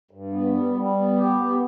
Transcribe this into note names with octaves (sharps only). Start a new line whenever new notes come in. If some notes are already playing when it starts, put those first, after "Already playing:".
G2
B3
G3
G3
B3
G4
B3